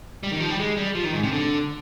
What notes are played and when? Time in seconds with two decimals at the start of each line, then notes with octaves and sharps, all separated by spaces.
0.23 G3
0.32 D#3
0.40 F3
0.50 G3
0.59 G#3
0.77 G3
0.95 F3
1.05 D#3
1.13 G#2
1.23 C3
1.32 D3